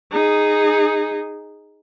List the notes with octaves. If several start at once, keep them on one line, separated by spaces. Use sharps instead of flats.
D#4 G#4